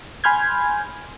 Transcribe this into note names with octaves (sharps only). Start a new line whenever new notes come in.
G#5 B5 C6 F6 G6 G#6